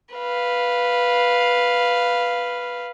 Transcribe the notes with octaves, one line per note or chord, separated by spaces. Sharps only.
B4 F5